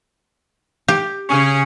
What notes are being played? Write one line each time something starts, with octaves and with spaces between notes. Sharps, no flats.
G4
C#3 C#4 G#4